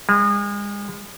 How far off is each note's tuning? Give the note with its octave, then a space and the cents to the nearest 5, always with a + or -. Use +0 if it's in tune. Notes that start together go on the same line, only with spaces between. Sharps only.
G#3 -35